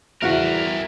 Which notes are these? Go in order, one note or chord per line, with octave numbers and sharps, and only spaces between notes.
E2 E4 F#4 A#4 F5